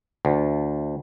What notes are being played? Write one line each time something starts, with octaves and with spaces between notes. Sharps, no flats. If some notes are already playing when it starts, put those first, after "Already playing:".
D2